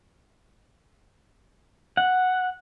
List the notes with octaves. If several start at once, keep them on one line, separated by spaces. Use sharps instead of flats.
F#5